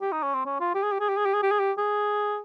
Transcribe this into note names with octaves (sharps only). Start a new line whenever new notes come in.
G4
D#4
C#4
C4
C#4
F4
G4
G#4
G4
G#4
G4
G#4
G4
G#4
G4
G#4
G4
G#4